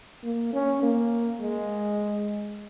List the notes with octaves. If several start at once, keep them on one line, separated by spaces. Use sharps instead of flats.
A#3
C#4
A#3
G#3